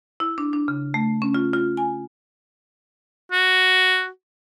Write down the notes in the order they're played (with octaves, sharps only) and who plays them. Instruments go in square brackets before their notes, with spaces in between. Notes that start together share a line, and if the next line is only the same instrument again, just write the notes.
[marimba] E4
D4
D4
C#3
A3
C#4
F4
F4
G#5
[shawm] F#4